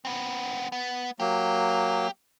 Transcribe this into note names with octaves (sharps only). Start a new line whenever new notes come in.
B3 C4
B3
F#3 A#3 G4